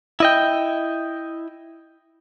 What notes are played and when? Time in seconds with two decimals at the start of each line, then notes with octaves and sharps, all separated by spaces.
0.20 E4 D#5 G5